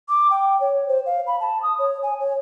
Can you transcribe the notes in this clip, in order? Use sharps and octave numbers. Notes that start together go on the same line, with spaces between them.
D6
G5
C#5
C5
F5
B5
A5
D#6
C#5
G#5
C#5